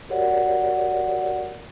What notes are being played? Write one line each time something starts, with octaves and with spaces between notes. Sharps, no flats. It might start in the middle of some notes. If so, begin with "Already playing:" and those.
F#4 G4 A#4 C#5 D5 F#5